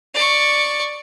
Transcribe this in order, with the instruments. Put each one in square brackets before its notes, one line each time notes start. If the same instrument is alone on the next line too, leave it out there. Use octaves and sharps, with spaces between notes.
[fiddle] D5 C#6